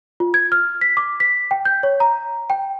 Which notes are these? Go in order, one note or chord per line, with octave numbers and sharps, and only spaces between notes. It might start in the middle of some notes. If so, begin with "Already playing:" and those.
F4
G#6
F6
B6
D6
B6
G5
G6
C#5
A#5
G5